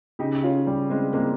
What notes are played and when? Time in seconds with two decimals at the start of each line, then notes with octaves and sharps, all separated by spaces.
0.19 C#3 D#4 G4
0.43 C#4 F4
0.67 G3
0.90 G#3 C4
1.13 G#3 A#3 C4